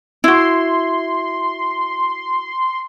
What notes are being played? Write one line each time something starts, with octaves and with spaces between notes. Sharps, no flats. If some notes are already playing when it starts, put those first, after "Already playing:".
E4 F#4 C6